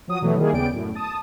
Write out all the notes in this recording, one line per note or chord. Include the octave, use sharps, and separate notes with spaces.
F3 F#3 D#6
B2 E3 F#3 G3 A3
D#3 G3 G#3 A#3 E4 G#4
D#2 C#3 B3 D5 G5 D7
F#2 A2
A5 D#6